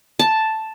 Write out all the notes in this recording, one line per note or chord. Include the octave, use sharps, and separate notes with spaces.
A5